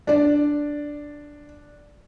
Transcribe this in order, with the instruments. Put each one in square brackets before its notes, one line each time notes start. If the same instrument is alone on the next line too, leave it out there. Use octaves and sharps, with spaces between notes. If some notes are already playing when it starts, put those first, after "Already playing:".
[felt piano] D4 D5